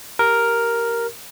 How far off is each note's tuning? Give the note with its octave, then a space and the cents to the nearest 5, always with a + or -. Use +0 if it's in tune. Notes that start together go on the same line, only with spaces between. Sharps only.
G4 +0 A#4 +0